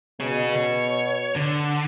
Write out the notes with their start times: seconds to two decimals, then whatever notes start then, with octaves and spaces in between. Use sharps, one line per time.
0.20 B2 G#4 C#5
0.56 C#5
1.36 D3